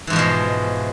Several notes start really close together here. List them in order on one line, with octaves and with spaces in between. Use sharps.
E3 G#2 F3 B2 G#3